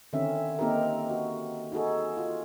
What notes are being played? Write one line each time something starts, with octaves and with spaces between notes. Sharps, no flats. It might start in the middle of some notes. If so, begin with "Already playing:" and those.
D3 D#3 C4 C#4 E5
A#3 C4 D#4 G4 A4 A#4
F#4
D#4 F#4 G#4 A4
F4